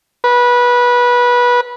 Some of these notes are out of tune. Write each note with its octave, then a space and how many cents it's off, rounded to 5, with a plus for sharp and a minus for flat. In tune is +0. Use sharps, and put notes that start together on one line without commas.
B4 -20